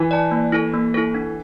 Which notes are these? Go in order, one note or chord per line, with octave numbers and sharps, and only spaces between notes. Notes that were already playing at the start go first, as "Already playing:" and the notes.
Already playing: E3
D5 A5
A#3
E4 A4
A#3
E4 A4
D4